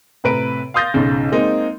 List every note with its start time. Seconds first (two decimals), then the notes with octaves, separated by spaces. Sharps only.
0.24 A2 C3 B4 A#5 D7
0.74 F5 C6 D#6 G6 A6 A#6
0.94 B1 G#2 C#3
1.32 G#3 A#3 C4 D#4